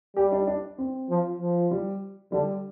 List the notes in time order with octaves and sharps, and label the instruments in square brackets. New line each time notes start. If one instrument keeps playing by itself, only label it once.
[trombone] G3 [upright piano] G4
[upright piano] D4
D4
C4
[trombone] F3
F3
[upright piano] G3
[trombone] D3 [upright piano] G3